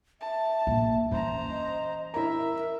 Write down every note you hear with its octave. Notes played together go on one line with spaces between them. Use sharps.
E5 A5
A#1 A2
E3 C#4 C5 A#5
D#5
E4 A#4 E5 A#5